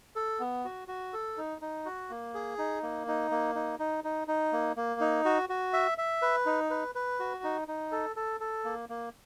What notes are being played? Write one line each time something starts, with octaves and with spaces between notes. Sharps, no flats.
A4
B3
F#4
F#4
A4
D#4
D#4
F#4
A#3
G#4
D#4
A#3
D#4
A#3
D#4
D#4
D#4
D#4
A#3
A#3
D#4
F#4
F#4
E5
E5
B4
D#4
B4
B4
F#4
D#4
D#4
A4
A4
A4
A#3
A#3